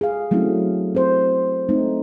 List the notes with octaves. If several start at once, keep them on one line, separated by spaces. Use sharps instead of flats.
G#4 F5
F#3 A3 C4 C#4 E4 F#4
C4 C5
A3 C4 D#4